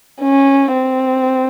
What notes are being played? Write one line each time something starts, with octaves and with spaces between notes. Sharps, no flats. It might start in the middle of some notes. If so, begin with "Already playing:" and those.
C#4
C4